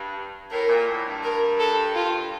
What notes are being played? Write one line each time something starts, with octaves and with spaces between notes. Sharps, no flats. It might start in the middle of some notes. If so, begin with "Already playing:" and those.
Already playing: G2
A2 A#4
A#2
A2
G2
A#4
A4
F4